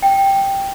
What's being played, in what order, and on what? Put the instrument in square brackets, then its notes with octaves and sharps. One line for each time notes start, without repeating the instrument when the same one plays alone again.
[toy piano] G5